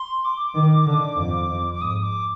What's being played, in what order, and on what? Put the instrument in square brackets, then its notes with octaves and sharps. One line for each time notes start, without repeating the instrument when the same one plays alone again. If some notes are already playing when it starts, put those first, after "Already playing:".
Already playing: [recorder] C6
D6
[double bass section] D#3
D3
F2
F2
[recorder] D6
[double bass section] G#2 [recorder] D#6
[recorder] D6